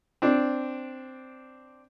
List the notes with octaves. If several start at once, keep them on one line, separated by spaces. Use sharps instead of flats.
C4 D4